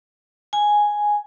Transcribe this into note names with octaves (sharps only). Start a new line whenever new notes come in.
G#5